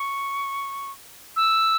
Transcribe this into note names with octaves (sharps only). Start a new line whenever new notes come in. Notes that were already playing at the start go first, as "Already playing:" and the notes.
Already playing: C#6
E6